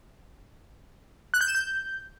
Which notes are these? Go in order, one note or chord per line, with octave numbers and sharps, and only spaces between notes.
F#6
G6
E7
G6